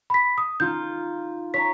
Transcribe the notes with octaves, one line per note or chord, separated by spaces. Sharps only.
B5 B6
D#6
D#4 F4 G6
C#5 A5 A#5 B6